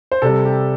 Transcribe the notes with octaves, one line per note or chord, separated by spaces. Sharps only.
C5
C3 G3 A4
G4